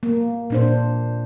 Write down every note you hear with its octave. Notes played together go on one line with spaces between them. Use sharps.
A#3
A#2 D4 C5